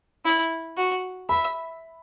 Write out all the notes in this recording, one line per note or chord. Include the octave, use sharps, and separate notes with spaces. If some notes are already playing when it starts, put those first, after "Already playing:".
E4
F#4
E5 B5